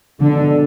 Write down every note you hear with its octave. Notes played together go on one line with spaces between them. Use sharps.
B2 D3 G#3 D4